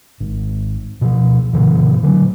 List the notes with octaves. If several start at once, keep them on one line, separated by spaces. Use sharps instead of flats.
G#1
B2 F3
A#2 C#3 E3
D3 F#3